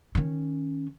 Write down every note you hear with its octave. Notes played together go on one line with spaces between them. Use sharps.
D#3 C#4